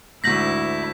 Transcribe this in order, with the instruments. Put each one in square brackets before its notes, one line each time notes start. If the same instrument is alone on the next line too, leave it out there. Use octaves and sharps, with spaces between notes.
[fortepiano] D2 G#2 [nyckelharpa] E4 [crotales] G6 B6 [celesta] A#6 F#7